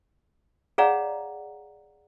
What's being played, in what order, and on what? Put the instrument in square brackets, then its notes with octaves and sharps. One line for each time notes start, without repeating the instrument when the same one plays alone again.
[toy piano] G#4 C#5 D5 F5 F#5 A#5